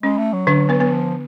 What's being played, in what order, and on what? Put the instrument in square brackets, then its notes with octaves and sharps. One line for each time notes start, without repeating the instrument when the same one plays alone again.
[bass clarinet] G#3 [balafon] C#4
[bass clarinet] A3
F#3
[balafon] D3 D4
B3 B4
B3 B4
[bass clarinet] F3